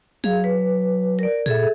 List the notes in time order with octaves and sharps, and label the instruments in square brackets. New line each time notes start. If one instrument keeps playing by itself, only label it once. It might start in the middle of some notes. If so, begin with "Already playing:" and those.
[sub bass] F#3 [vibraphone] G#4 F5
[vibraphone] B4
A#4 D5
[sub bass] A#2 [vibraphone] G#4 A4 E5